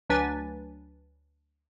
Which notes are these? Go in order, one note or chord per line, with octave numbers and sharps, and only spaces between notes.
D2 F#3 D4 B4 G#5 A6